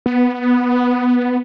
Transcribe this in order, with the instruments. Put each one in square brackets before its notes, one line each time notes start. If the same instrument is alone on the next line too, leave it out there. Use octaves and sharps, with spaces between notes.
[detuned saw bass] B3